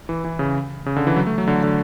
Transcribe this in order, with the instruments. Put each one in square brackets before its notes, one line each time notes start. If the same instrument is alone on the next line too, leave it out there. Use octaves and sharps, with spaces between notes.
[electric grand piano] E3
E3
C#3
C#3
D3
E3
F#3
A3
F#3
D3
D3